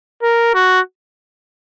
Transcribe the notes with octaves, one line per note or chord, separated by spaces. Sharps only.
A#4
F#4